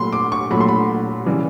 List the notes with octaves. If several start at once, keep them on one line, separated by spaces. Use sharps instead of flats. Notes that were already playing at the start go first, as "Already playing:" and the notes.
Already playing: A#2 F#3 A3 B5 C6
D6
C#6
A#2 F#3 A3 B5
C6
B5
C#3 E3 G3